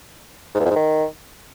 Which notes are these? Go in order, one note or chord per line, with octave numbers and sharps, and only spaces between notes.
G#2
E2
F2
G#2
D#3